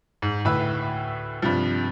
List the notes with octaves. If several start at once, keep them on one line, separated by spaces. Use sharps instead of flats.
G#2
D2 A2 E4 B4 E5
G2 C3 F3